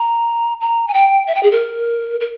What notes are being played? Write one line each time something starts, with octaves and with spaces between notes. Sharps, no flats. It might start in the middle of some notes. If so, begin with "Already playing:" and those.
Already playing: A#5
A#5
G#5
G5
E5
G5
G#4
A#4
A#4